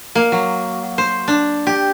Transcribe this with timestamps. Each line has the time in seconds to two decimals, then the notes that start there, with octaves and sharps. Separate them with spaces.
0.15 A#3
0.32 F#3
0.98 C5
1.28 D4
1.67 G4